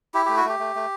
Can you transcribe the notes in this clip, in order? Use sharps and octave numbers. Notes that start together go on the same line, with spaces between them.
E4 G4
A3 G4
F#4
A3 G4
A3
A3